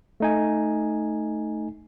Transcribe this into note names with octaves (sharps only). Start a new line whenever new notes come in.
A3 D#4 G#5